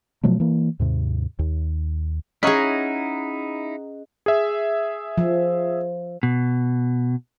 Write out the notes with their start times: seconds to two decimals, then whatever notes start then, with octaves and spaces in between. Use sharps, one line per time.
0.24 B2 F3 F#3 A3
0.40 E3 A#3
0.80 D#2 G#2 C3
1.39 D#2
2.43 C#4 D#4 E4 G#4 D#5 F#5 A#5
4.26 G#4 E5
5.18 F3
6.23 B2